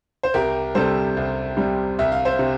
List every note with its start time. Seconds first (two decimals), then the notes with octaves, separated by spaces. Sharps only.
0.23 C5
0.34 C2 G4 A#4
0.75 C3 G3 A4 C5
1.17 C2
1.57 C3 G3
1.99 C2 E5
2.12 F5
2.25 C5 E5
2.39 C3